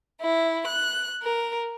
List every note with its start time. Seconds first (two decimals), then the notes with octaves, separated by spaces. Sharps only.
0.21 E4
0.65 F#6
1.22 A#4